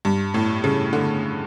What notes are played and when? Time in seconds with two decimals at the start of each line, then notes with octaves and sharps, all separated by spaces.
0.05 G2
0.34 A2
0.64 C#3
0.93 D3